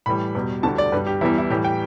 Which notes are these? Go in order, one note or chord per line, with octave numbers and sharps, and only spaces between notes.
A2 E3 G3 B5
E2 B2 G3
D2 D3 G3 A5
D5
G2 G3 B4
G4
E2 E3 G3 E4
E4
A2 E3 G3 G4
G5